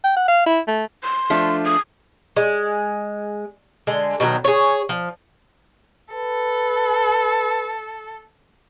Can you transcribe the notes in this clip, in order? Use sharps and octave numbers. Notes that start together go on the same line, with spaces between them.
G5
F#5
F5
E4
A3
C6
F3 A3 D4
D#6
G#3
D3 G#3
B2 D#3 F#3
G#4 C#5
F3
A4 B4